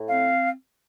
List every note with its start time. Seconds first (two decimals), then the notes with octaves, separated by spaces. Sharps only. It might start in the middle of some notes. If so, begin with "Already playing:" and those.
Already playing: A2
0.08 C4 F5